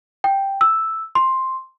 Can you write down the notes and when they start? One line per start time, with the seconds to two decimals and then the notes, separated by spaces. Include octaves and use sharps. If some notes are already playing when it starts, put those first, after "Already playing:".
0.24 G5
0.61 E6
1.15 C6